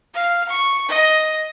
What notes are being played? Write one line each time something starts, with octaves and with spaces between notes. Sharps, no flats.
F5
C#6
D#5